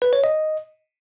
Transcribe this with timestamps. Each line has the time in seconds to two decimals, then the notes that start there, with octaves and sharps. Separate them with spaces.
0.02 B4
0.13 C#5
0.24 D#5